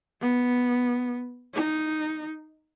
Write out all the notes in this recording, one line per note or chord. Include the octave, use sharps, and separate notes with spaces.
B3
D#4